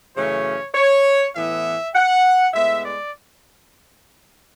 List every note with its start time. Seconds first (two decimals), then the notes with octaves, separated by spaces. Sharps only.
0.15 F#2 C#3 E3 A3 C#4 C#5
0.75 C#5
1.35 A2 E3 B3 E5
1.95 F#5
2.54 A2 G#3 B3 E5
2.84 D5